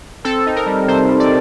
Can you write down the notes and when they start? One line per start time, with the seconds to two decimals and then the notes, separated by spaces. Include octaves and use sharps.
0.25 C4 A4
0.47 D#4
0.56 A#4
0.67 G3
0.88 C3 C5
1.08 G3
1.20 D5